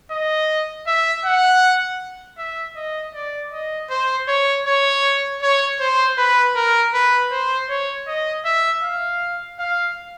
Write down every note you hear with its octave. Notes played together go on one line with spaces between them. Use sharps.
D#5
E5
F#5
E5
D#5
D5
D#5
C5
C#5
C#5
C#5
C5
B4
A#4
B4
C5
C#5
D#5
E5
F5
F5